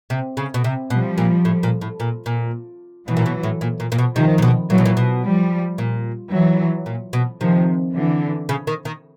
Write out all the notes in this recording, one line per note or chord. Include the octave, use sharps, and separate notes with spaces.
C3
C#3
B2
C3
B2 F3 G3
A#2
A2
A#2
A2
A#2
A#2
B2 E3 F#3
A#2
B2
A2
A#2
A#2
A#2
B2
C3 D#3 F3
A#2
B2
A#2 E3 F#3
B2
A#2
B2
F3 G3
A#2
E3 F#3
A#2
B2
C3 D#3 F3
D3 E3
C#3
D#3
D#3